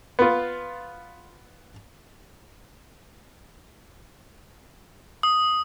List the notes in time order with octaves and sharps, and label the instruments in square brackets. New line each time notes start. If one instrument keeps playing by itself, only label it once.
[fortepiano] B3 F4
[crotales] D#6